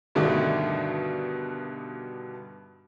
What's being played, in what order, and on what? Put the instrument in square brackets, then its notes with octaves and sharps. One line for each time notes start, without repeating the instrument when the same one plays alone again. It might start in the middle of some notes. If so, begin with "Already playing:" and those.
[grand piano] G2 B2 D3 D#3 A3